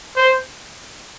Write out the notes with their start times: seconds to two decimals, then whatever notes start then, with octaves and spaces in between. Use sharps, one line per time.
0.16 C5